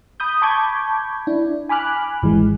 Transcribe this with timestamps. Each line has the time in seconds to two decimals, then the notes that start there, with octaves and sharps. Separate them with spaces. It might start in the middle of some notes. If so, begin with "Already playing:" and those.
0.20 B5 D#6 G6
0.42 A5 B5 C#6 D6 G6 G#6
1.27 D4 E4
1.69 G#5 B5 D6 F6 F#6
2.22 G#1 E3 G#3